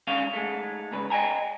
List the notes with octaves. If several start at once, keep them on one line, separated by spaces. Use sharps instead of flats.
G#2 D3 D#3 C#4 F5
G#2 G#3 A3
G#2 C#3 B4
D#5 G5 G#5 A#5